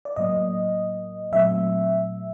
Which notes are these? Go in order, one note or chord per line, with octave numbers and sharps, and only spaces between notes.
D5
A2 F#3 A#3 D#5
A#2 F#3 A3 C4 E5